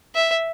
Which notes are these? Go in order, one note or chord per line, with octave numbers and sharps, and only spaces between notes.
E5